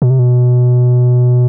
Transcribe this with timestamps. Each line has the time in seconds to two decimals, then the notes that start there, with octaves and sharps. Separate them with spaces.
0.02 B2
0.10 C3
0.19 B2